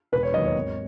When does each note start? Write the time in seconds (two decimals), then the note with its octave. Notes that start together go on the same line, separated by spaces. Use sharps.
0.12 E1 B4
0.23 C#5
0.34 D#2 D#3 F#3 D#5
0.44 C#5
0.55 G#1